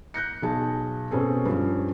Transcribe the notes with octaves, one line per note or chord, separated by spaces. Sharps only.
F#6 G6 A#6 C#7
B1 G#4 A5
B2 C4 C#4 G#4 A4
G2 F3 C#4